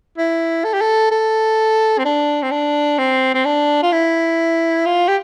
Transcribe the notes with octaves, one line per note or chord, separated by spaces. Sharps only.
E4
A4
G4
A4
A4
C4
D4
C4
D4
C4
C4
D4
F4
E4
F4
G4